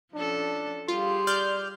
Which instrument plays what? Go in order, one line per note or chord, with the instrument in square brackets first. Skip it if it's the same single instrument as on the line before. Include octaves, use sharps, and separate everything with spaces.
[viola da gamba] F3 C#4 A4 [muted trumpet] D4
[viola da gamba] G3 G4 G#4 [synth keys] F4 [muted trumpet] C6
[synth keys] D5 F6 G6